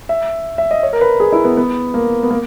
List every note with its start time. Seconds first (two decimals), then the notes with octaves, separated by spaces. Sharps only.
0.09 E5
0.58 E5
0.71 D#5
0.83 C#5
0.93 A#4
1.01 B4
1.20 G#4
1.32 E4
1.45 B3
1.57 B3
1.94 A#3
2.23 B3
2.30 A#3